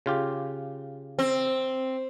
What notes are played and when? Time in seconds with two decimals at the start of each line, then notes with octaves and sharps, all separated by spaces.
0.06 C#3 F4 G4
1.19 C4